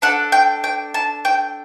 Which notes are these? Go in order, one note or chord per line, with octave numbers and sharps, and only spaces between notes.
D4 A4 F#5
G5
G5
A5
G5